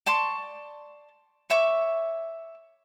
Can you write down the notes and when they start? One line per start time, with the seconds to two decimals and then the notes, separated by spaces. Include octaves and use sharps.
0.06 D5 A5 C6 C#6
1.50 C#5 E5 C#6 D6